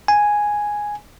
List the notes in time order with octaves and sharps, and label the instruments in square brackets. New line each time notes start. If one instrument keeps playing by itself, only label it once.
[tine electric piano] G#5